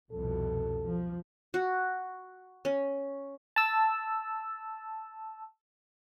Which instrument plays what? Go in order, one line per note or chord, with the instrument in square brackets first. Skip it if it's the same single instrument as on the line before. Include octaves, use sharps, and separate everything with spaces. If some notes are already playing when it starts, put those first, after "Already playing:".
[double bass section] C2 F2 B2 [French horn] A4
[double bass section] F3
[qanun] F#4
C#4
[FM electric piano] A5 E6